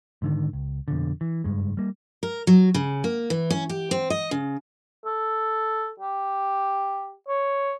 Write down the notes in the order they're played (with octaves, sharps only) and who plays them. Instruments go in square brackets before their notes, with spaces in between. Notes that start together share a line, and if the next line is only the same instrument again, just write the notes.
[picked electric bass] G#2 D3 D#3
C#2
F2 B2 D3
E3
F#1 G2 G#3
G3 A#3
[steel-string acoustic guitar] A#4
F#3
C#3
A#3
E3
C#4
G4
C4
D#5
C#3
[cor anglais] A4
G4
C#5